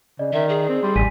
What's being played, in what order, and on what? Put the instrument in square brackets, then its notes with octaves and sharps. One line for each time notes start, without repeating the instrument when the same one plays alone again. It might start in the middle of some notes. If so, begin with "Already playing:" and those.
[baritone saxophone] C#3 [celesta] D5 D#5
[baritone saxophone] D#3 [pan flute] E5
[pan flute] G#4
[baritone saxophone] C4
[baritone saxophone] G3 [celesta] C6
[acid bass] A1 [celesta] G#5 B6 D#7